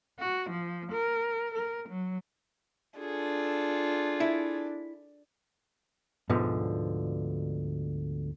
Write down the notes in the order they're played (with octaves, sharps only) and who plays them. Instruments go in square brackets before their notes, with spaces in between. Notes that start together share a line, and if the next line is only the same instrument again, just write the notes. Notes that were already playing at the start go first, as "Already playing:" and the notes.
[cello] F#4
F3
A#4
A#4
F#3
[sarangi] D4 [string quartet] F4 G#4 A4
[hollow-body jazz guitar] E4
D2 G#2 B2 D3 F3